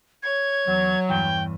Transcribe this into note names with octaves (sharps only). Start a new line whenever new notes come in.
C#5 G#6
E2 F#3
E2 G2 E3 G5